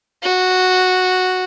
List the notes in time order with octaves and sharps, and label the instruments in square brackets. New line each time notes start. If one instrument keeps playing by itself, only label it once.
[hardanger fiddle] F#4